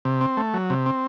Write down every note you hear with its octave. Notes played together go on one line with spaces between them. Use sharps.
C3
C4
A3
F#3
C3
C4